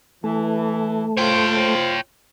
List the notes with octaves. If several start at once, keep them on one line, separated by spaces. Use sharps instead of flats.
E3 A3
F4 C5 C#5 G5